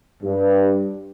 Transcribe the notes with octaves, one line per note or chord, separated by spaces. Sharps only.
G2